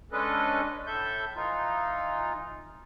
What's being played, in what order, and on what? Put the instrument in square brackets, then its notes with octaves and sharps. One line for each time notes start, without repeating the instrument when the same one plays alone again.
[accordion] G#3 C#4 D4 A4 B4 D#5
A2 A4 E5 G6
E3 D#4 F4